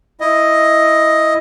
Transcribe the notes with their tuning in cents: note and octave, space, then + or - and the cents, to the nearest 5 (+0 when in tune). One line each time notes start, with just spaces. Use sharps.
E4 +0 D#5 +5